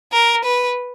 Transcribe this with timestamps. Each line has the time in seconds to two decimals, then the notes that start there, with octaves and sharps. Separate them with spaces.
0.13 A#4
0.45 B4